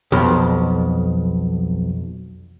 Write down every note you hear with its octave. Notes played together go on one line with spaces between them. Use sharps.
B1 F2